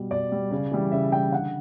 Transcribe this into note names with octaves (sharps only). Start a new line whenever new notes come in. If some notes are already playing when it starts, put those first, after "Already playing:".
Already playing: B2 G3
B2 D5
G3
C#3
E3 G3
C#3 E5
E3 G3 G5
D3 F#5